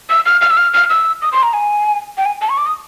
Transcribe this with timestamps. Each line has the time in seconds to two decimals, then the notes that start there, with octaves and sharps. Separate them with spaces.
0.09 E6
0.26 F6
0.41 F6
0.50 E6
0.57 F6
0.73 F6
0.90 E6
1.22 D#6
1.32 C6
1.43 A#5
1.53 G#5
2.17 G5
2.26 G#5
2.42 A5
2.49 C#6
2.57 D6
2.66 D#6